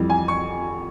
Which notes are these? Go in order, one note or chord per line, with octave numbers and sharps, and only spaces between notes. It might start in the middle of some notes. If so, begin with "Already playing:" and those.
Already playing: F2 E3 G3
G#5
C#6